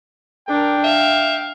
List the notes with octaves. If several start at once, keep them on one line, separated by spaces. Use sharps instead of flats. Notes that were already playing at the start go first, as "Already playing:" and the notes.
D4 A#4 G5
E5 F5